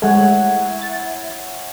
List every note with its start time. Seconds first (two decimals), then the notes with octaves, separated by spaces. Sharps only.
0.02 G#3 A3 E4 C#5 F#5 G#5
0.82 A6